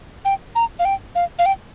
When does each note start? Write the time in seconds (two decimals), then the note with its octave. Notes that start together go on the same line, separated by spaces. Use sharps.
0.25 G5
0.55 A#5
0.79 F5
0.85 G5
1.15 F5
1.39 F5
1.46 G5